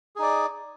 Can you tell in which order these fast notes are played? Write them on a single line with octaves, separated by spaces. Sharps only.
G#4 D#4 D5